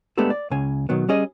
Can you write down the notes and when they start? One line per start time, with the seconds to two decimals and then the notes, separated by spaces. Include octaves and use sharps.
0.18 G#3 A3 B3 D4 G4 A4
0.30 D5
0.51 C#2 C#3 G#5
0.89 B2 D#3 F#3 B3
1.09 G3 C#4 G#4 D#5